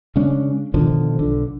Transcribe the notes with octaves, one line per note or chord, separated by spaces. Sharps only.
C#3 G#3 C#4 D4
B2 D3 D#3 F3
B1 D3